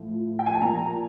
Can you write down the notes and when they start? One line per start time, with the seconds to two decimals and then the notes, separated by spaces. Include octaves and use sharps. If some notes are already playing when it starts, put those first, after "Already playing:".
Already playing: A2 F3
0.39 G5
0.46 G#5
0.54 A5
0.61 A#2 F3 A#5